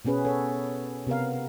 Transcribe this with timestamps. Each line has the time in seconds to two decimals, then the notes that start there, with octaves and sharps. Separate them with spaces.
0.05 B2 B3 C#4 G#4 B4
0.25 A4 C#5
1.07 C3 B3 A#4 F5